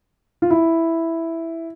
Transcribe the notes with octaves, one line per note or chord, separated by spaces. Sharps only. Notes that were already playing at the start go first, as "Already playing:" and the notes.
F4
E4